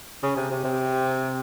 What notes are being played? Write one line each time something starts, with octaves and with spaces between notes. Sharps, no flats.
C#3
C3
C3
C3